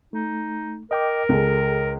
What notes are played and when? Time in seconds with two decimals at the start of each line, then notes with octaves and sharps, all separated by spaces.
0.13 A3 D#4
0.91 A#4 D#5 G5 D6
1.29 C#2 G#4 A4